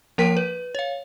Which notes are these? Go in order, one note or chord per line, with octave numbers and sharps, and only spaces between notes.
F3 A#3 A#4 G5 B6 D#7
B4
C#5 F5